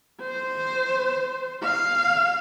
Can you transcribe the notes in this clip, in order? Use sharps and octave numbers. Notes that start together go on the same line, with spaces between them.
C5
F5